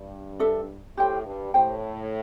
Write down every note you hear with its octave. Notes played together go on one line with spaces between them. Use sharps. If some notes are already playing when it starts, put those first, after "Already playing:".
Already playing: G2
D4 A4 E5
A2 G4 C5 G5
G2
A2 G4 C5 G5